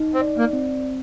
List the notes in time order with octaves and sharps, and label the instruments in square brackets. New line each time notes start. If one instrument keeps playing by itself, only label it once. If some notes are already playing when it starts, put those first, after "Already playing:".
Already playing: [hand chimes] D#4
[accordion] C4
[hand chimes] D5
[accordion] A#3
[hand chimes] C4